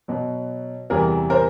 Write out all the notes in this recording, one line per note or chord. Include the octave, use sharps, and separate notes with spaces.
B2 F#3
E2 C3 E3 G3 G#4 A#4
A#4 C5